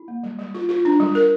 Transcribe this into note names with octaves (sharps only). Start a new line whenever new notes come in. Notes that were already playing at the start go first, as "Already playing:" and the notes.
Already playing: E4
A#3
G3
G3
F4
F4
D4
G3
A#4